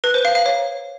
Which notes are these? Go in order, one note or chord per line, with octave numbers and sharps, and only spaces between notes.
B4
C5
F5
F5
C#5